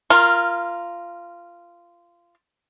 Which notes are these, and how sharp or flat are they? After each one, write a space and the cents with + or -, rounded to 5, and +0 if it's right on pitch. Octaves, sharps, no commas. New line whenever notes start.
F4 -15 A#4 +0 C6 +20